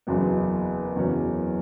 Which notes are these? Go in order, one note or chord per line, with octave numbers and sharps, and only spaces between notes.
F#1 E2 C#3 F#3 B3
F#1 E2 C#3 F#3 C#4